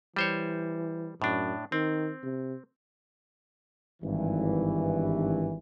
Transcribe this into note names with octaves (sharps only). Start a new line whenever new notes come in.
E3 G3 C5 C#5
F#2 A2 D4
D#3 C4
C3
G#1 G2 E3